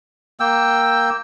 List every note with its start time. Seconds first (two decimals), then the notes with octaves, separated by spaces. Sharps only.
0.40 A#3 G5 E6